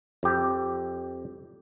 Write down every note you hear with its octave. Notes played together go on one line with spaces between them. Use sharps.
F2 G4